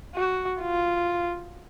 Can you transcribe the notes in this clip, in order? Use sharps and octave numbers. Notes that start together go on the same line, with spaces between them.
F#4
F4